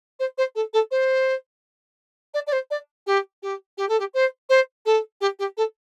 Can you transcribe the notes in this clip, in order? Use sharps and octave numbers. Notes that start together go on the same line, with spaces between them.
C5
C5
A4
A4
C5
D5
D5
C5
D5
G4
G4
G4
A4
G4
C5
C5
A4
G4
G4
A4